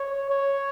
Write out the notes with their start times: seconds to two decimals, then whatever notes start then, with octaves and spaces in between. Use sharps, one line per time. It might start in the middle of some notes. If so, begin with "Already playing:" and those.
Already playing: C#5
0.30 C#5